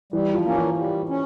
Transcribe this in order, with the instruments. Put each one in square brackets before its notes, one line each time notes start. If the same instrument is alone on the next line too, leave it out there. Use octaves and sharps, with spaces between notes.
[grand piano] E3 [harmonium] G3
[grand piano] F3
[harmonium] A#3 C#4
[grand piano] E3
[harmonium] G3
C#4